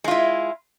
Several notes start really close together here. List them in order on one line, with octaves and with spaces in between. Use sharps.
G#3 F4 E4